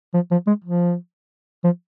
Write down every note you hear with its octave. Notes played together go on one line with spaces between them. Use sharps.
F3
F3
G#3
F3
F3